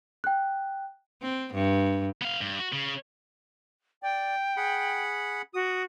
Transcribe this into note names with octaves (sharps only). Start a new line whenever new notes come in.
G5 F#6
C4
G2
B3 F5
G2
F#4
C#3
D5 G5
G#4 F#5 B5
F#4 D#6